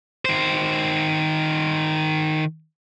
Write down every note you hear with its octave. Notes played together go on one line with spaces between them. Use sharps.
D#3 C5